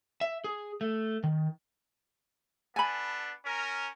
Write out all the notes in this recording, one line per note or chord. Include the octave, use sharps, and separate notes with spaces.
E5
G#4
A3
D#3
B3 D4 A4 G#5 B5
C#4 A#4